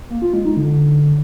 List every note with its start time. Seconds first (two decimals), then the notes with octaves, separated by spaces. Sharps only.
0.10 A#3
0.22 F4
0.34 G#3
0.45 D#4
0.57 D3